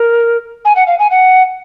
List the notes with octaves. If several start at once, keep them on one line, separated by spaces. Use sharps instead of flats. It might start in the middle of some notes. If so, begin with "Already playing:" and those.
Already playing: A#4
G#5
F#5
F5
G#5
F#5